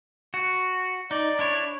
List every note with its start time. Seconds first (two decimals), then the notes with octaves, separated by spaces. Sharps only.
0.34 F#4
1.11 D#4 D5
1.39 D4 E4 C#5